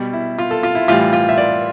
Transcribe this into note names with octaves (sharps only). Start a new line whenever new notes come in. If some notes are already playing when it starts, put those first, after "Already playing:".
Already playing: B2 G3
E4
F4
A4
F4
E4
A2 E3 G3 F4
F4
E5
D5